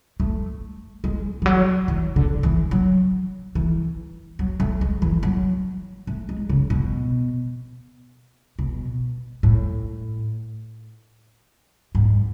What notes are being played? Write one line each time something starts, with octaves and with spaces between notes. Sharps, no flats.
A3
G#3
E3
F#3
E3
D3
E3
F#3
E3
F#3
A3
G#3
E3
F#3
A3
G#3
C#3
B2
B2
A2
G#2